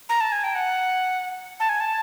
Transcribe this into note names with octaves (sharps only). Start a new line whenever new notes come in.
A#5
A5
G#5
G5
F#5
A5
G#5
A5